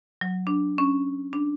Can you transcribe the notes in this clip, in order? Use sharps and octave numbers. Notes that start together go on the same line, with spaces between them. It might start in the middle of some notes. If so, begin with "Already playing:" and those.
F#3
D4
C#4
D4